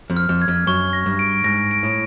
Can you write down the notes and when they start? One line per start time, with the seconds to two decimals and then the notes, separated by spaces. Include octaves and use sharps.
0.10 F2
0.17 F6
0.29 F2
0.42 G#6
0.48 F2
0.67 F#2 C#6
0.93 A#6
1.06 G2
1.19 D7
1.44 G#2 A#6
1.71 D7
1.83 A2